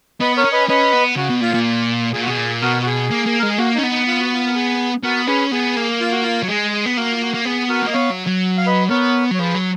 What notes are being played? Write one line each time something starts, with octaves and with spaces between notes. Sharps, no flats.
B3 B4 D#5
A#4 C#5
C#4
B4 D#5
C#4 B4 D#5
B3
C#3 F#4
B2
A#2 F4
A#2
A#2 G#4
F#4
B2 G#4
A#2
B2 F#4 A#4
F#4
G#4
A#3
A#3
G#3 A#4
G#4
A#3 F#4
C#4 D#4
B3
D#4
F4
F#4
F4
A#4
G#4
B3 F#4 A#4
C#4 G#4 B4
B3 G#4
A#3
F4
F#4
F4
F#3
G#3 G#4
G#4
B3
A#3 F#4 A#4
F4
F#4
A#3
B3 G#4
F#4 A#4
A#3 D#5
B3 C#5 F5
F#3
F#3
F5
B4 D#5
B3 A#4 C#5
F#3
C#5
F3 G#4 B4
F#3